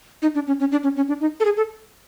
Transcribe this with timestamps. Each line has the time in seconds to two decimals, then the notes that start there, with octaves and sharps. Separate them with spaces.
0.22 D#4
0.35 D4
0.47 C#4
0.60 C#4
0.72 D4
0.83 C#4
0.96 C#4
1.08 D4
1.21 D#4
1.40 A4
1.45 G#4
1.57 A4